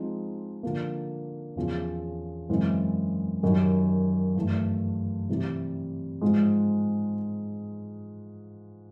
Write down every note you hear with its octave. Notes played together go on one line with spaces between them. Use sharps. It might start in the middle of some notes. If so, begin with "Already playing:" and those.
Already playing: F3 G#3 C4 D#4
D3 F3 A#3
E2 C#3 F3
F#2 C#3 E3 G#3 C4
F#2 D#3 G3
G2 E3 A3
C3 E3 G3
G#2 F3 G#3